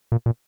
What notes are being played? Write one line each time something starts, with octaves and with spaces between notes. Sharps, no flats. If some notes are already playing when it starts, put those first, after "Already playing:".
A#2
A#2